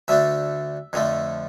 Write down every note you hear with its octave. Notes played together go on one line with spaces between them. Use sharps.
D2 D3 A3 D4 E5
F2 D3 F3 A3